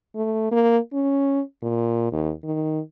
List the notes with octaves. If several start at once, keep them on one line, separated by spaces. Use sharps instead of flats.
A3
A#3
C#4
A#2
D#2
D#3